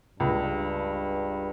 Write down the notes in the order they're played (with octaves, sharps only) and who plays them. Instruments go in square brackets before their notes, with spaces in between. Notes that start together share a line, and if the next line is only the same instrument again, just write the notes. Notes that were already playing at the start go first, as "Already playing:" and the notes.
[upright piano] C#2 [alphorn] G2